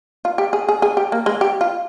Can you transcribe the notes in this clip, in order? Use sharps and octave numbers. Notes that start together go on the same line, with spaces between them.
F4
G4
G#4
G#4
G#4
G4
A#3
G#3
G4
F4